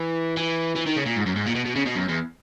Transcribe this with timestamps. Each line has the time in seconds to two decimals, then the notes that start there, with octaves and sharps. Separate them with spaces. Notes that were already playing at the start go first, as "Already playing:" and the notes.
Already playing: E3
0.37 E3
0.76 E3
0.87 D#3
0.96 C#3
1.06 A#2
1.16 G#2
1.26 F#2
1.36 G#2
1.46 A#2
1.55 B2
1.65 B2
1.75 C#3
1.86 B2
1.95 F#2
2.08 E2